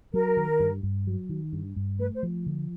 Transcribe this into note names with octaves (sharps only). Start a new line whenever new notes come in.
F#3 A#4
D#3
G2
G2
F#3
D#3
G2
G2
A3 B4
C5
F3
D3